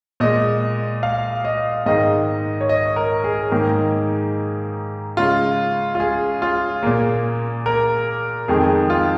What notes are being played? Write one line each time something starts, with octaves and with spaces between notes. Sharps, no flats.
A#2 G#3 D#5
F5
D#5
G#2 D#3 G#3 D#5
C#5
D#5
A#4
G#4
G#2 D#3 A#3
C#3 G#3 F4
F4
G#4
F4
A#2 A#3 G#4
A#4
F2 D#3 G#3 G#4
F4